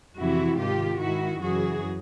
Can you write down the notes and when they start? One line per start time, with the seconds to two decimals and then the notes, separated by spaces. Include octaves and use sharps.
0.18 F2 C3 E3 E4 F#4
0.59 G#2 D#3 F4 G4
1.00 G#2 D#3 E4 F#4
1.41 F#2 C#3 E3 F#4 G#4